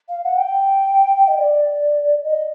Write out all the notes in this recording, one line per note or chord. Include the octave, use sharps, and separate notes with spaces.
F5
F#5
G5
D#5
D5
D#5